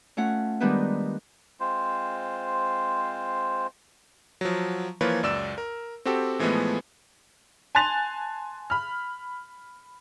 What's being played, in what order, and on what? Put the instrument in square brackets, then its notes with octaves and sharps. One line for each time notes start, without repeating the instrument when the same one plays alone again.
[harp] A3 C#4 F4 F#5
D#3 G3 G#3 B3 D4 B4
[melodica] G#3 C4 F4 C5
[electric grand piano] F3 F#3
E3 F3 A#3 F4 B4 C#5
C#2 F#2 D5 E6 E7
A#4
C4 F#4 G4 A4
A2 E3 F3 G#3 A3 B3
[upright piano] G#5 A5 C6 F#6 A6 F7
B5 F6